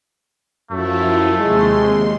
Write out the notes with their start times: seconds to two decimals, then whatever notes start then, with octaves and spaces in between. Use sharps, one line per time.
0.71 F#2 F3 A3 E4 F4
1.40 D#2 C3 G#3 C6